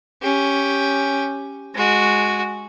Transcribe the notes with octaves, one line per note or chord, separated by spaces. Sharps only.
C#4 G4
G#3 F#4